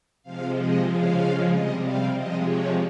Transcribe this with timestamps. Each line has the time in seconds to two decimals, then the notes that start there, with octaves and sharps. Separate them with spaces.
0.23 C3 F3 G#3 F5
0.55 D#5
0.86 C#3 F3 G#3 F5
1.48 C3 G3 D#5
1.81 F5
2.12 C3 F3 G#3 D#5
2.44 C#5